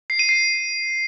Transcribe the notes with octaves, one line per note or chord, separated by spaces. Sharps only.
C7
D#7
C7